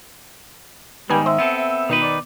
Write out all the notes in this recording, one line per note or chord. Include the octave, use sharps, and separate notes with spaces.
G#2 D#3 G3 B3 G#5
C5 E5
B3 C4 A4
E5
B2 D#3 D#4 B4
D5